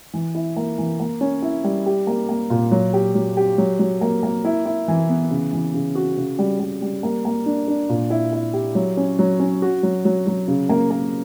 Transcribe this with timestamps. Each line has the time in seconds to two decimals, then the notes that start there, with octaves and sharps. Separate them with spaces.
0.14 E3
0.35 E4
0.56 A#3
0.78 E3
1.00 A#3
1.21 C#4
1.42 E4
1.64 G3
1.86 G4
2.07 A#3
2.29 A#3
2.50 A#2
2.72 F#3
2.93 G4
3.15 F#3
3.37 G4
3.58 F#3
3.79 F#3
4.01 A#3
4.23 A#3
4.45 E4
4.66 E4
4.88 E3
5.09 B3
5.31 C#3
5.53 E3
5.74 C#3
5.95 F#4
6.17 C#3
6.39 G3
6.60 G3
6.82 G3
7.03 A#3
7.25 A#3
7.46 D4
7.68 D4
7.89 A#2
8.10 E4
8.33 E4
8.53 G4
8.75 F#3
8.97 C#4
9.19 F#3
9.40 C#4
9.62 F#4
9.83 F#3
10.05 F#3
10.27 F#3
10.48 C#3
10.69 A#3
10.91 A#3